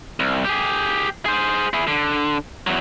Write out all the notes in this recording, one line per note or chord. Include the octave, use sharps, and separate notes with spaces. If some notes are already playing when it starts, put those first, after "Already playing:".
C2
G4 G#4
G#4 C5
E4 G#4
D3
E2 F#3